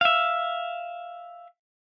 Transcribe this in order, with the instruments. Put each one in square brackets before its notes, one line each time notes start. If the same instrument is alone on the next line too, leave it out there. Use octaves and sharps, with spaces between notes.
[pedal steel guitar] E5 F5